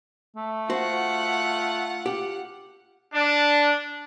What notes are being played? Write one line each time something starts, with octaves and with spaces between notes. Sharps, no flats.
A3
F4 F#4 C5 F#5
G4
D4